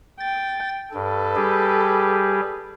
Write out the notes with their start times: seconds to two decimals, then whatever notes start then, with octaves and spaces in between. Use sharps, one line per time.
0.20 G5 A6
0.94 G2 A4 B4
1.36 G3 G4 G#4